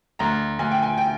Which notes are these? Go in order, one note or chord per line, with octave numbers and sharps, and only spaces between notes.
D2 A#5
D2 G#5
G5
G#5
G5